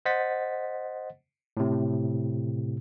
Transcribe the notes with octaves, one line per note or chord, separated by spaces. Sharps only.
C5 D#5 F#5 A6 B6
A2 C3